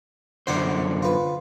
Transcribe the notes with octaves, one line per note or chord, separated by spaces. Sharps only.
F#2 D3 D4 C5 F#5 G5
F4 B4